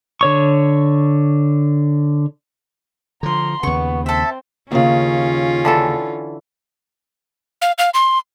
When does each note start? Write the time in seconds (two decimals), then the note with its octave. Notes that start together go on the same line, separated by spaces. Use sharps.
0.21 D3 C#5 C#6
3.23 D3 F3 A#5 C6
3.63 D#2 C#3 B3 C#6
4.06 C4 A4 E5
4.72 D#2 C#3 C#4 F4
5.65 D3 E3 A4
7.62 F5
7.78 F5
7.94 C6